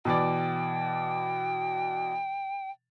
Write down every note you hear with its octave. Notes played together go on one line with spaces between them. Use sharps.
B2 E3 D5 G5